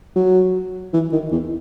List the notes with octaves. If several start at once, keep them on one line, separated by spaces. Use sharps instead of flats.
F#3
E3
D#3
E2